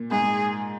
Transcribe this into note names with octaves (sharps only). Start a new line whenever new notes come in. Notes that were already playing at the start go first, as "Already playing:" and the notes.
Already playing: A#2
G#2 G#4